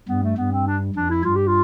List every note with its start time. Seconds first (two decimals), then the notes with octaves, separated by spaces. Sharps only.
0.09 G2 B3
0.23 A3
0.37 G2 B3
0.52 C4
0.67 D4
0.96 F2 D4
1.10 E4
1.25 G2 F4
1.36 G4
1.47 F4